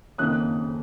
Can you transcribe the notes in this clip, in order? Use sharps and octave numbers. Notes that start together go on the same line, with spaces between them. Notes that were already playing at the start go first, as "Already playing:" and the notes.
F#1 F2 D#3 A#3 C#4 D#6 F#6